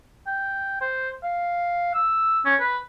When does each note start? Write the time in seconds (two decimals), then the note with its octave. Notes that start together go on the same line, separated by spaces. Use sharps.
0.27 G5
0.81 C5
1.23 F5
1.94 E6
2.45 C#4
2.60 B4